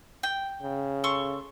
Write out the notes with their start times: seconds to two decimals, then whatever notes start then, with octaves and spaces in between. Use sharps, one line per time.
0.23 G5
0.62 C#3
1.04 A4 C6 C#6